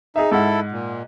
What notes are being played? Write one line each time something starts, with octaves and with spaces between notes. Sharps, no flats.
D#4 G#4 E5
G#2 E4 A4 F#5
A#2